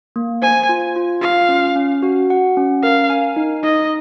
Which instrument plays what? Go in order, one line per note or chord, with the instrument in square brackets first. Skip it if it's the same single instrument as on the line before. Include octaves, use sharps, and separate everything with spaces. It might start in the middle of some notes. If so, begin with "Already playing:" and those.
[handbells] A#3
[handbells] C5 [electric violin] G#5
[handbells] F4
F4
[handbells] F4 [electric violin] F5
[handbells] C#4
C#4
F#4
F#5
C#4
[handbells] A#4 [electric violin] F5
[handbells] G#5
D#4
[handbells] D#4 [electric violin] D#5